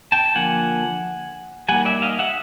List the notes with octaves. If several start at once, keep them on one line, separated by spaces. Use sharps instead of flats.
G5 A5
D3 F3 A#3 F#5 G#5
G3 A#3 D#4 F#5 G#5
D5 E5
D#5 F5
E5 F#5